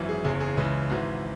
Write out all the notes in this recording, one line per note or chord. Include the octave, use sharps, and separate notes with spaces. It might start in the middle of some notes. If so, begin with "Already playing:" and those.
Already playing: G#1 F#2 E3
G#4
F#1 E2 C#3 G#4
G#4
C#2 C#3 E3 B4
G#1 G#2 E3 F#4